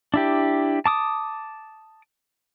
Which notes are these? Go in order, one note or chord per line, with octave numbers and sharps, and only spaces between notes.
D4 E4 G4
A5 D6 D#6